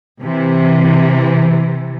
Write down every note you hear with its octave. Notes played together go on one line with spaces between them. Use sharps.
C3 E3